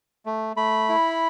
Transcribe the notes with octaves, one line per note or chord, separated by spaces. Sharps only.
A3
A3 B5
E4